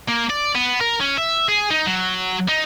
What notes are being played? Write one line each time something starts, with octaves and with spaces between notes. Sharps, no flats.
A#3
D5
B3
A#4
C#4
E5
G#4
D#4
F#3
D#4